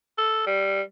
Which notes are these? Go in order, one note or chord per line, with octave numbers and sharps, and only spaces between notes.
A4
G3